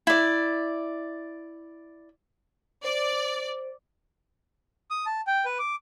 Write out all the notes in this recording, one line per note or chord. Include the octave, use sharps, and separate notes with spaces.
E4 D5
C5 D5
D#6
A5
G5
B4
D6